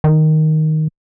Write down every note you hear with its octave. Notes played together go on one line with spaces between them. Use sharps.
D#3